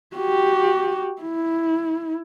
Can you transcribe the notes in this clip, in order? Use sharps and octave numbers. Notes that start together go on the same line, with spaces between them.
F#4 G4
E4